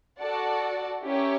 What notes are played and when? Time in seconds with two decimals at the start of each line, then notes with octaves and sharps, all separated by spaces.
0.19 F#4 A4 D5 F#5 A5
1.03 C#4 E4 G4 A#4 C#5